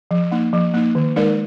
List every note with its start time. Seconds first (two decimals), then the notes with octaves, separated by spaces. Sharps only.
0.11 F3
0.32 A#3 D#4
0.53 F3
0.74 A#3 D#4
0.95 D#3
1.16 G#3 D#4 A#4 D5